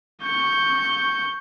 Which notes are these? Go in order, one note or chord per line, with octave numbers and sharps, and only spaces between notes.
C#6 G6